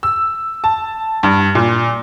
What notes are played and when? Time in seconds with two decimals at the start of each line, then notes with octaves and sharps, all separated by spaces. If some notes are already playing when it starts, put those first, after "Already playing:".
0.03 E6
0.64 A5
1.23 G2
1.55 A#2